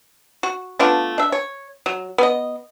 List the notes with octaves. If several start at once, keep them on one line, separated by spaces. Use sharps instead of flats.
F#4
A3 B3 D4 F4
D4 E5
C#5
F#3
B3 D#5